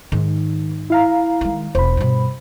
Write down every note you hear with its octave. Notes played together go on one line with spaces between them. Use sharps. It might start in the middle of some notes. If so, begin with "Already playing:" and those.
G#2 D#3 D#4
E4 F5 A#5
D#3 G#3
E1 C5 B5
G2 B2